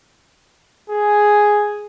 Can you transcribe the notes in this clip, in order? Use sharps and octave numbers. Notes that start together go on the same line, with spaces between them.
G#4